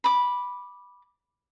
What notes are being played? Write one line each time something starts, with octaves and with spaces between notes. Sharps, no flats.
B5 D6